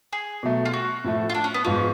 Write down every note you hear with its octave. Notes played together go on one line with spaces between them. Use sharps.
G#4
B2 F#3 A3
F4
F#4
A2 F3 A3
F4
D4
C#4
B3
G#2 F3 B3 C#4 F4